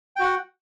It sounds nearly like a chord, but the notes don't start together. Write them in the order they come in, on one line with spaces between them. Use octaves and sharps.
G5 F#4 F#5